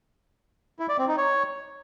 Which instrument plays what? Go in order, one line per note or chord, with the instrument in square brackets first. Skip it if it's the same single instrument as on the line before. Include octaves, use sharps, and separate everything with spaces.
[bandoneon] E4
D5
C4
D#4
C#5